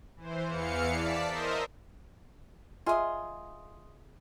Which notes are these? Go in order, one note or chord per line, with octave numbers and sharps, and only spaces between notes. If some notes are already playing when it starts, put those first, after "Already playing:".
E3 C5
E2 E3 F5 C#7
D5 A5 B6
A#4 C5 D#5 E5
F4 G#4 D#5 E5 C6